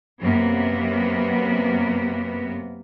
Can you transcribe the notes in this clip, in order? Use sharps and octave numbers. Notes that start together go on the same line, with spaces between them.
F#2 C3 A#3 B3